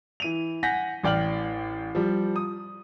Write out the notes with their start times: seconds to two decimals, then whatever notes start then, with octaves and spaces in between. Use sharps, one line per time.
0.20 E3 D#7 F7
0.63 F#5 G#5 G6 A#6 B6
1.03 A1 D5 G5 F6 F#7
1.95 F3 G3
2.36 D#6